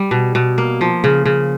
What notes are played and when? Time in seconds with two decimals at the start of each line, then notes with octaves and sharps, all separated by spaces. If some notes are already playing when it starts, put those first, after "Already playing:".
Already playing: G3
0.11 B2
0.35 B2
0.58 A#3
0.81 F3
1.04 C#3
1.25 C#3